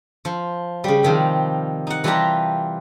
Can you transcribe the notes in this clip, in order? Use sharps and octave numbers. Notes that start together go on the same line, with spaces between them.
F3
C#3 G3
C3 D#3 F3 G3
D#4 F#5
E3 G3 F4 G4 A5 A#5